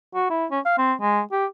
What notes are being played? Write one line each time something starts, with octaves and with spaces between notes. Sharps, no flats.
F#4
E4
C#4
F5
C4
G#3
G4